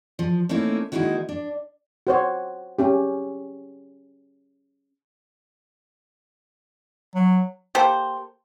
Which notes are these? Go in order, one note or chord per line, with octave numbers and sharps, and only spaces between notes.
F3
A3 A#3 C4 C#4 D#4 E4
D#3 G#3 A#3 D#4 E4 F#4
D4
F#4 C5 C#5
C#4 G4
F#3
A#3 G4 A4 C5